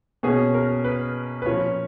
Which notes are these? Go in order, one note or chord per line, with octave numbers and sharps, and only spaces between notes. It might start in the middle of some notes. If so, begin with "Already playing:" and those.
B2 A#3 C#4 G#4
A#4
B4
B4
A#2 F3 A#3 C#4 C#5